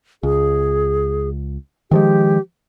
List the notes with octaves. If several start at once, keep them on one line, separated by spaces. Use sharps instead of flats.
C#2 G#4
D#3 F3 G#3 G4